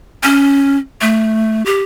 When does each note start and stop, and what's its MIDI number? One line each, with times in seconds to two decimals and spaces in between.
0.23 0.77 61
1.01 1.64 57
1.66 1.83 67